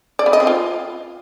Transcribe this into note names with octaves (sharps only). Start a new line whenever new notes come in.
D5
B3
D#5
C4
F4